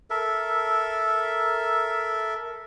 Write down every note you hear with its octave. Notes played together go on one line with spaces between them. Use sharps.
A4 A#4 E5